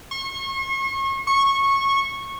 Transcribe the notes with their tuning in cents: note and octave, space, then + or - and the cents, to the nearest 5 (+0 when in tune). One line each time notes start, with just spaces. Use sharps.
C#6 -40
C#6 -15